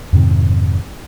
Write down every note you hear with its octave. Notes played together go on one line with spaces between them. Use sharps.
F2 G#2 C3 D#3